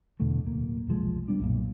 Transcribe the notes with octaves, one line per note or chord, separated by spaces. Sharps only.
E2 B2 D3 A3
D1 A#3
F1 B1 F3 G#3
G3 B3 D4
B1 F#2 A#2